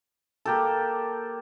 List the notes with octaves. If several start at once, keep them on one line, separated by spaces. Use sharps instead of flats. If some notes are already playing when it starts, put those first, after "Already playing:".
A#3 G4 A4